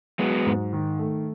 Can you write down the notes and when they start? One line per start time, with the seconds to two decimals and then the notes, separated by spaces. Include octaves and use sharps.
0.19 F#3 G#3 B3
0.46 G#2
0.73 D#3
0.99 A3